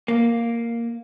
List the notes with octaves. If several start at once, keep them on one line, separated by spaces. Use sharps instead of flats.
A#3